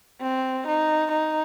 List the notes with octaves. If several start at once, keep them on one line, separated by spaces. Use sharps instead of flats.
C4
D#4
D#4